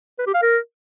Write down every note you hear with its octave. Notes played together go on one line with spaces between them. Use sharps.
B4
G4
F5
A#4